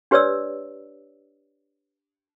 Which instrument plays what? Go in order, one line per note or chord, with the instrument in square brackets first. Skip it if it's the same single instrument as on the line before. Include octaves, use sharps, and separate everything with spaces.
[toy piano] D4 G4 B4 C#5 D5 E6